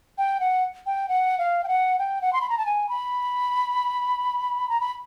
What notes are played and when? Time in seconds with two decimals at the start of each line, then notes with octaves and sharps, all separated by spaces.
0.18 G5
0.40 F#5
0.86 G5
1.09 F#5
1.38 F5
1.64 G5
1.68 F#5
1.99 G5
2.22 F#5
2.33 C6
2.41 B5
2.50 A#5
2.58 A5
2.66 G#5
2.89 B5
4.69 A#5
4.80 B5